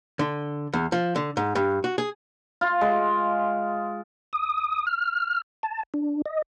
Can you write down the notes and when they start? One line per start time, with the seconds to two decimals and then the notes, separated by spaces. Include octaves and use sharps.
0.19 D3
0.73 E2
0.92 F3
1.16 D3
1.37 G#2
1.55 G2
1.84 F#4
1.98 G#4
2.61 F4
2.81 G#3
4.33 D#6
4.87 F6
5.63 A5
5.94 D4
6.26 D#5